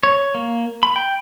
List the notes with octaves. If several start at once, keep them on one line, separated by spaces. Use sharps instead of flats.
C#5
A#3
B5
G5